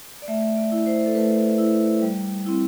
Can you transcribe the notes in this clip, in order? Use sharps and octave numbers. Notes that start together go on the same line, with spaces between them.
D5
A3 E5
D5
E4
C5
A4
A3 B4
E4
G3
C4 E4